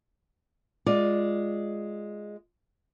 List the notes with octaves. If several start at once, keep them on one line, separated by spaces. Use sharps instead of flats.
G#3 F4 D5